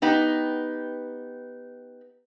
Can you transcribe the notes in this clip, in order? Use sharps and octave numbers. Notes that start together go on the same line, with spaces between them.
B3 D#4 G4